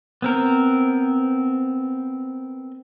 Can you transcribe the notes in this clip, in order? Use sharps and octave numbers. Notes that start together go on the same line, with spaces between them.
B3 C4 A#4